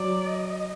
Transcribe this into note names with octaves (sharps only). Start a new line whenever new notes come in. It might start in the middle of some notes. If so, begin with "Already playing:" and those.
Already playing: F#3 D5
D#5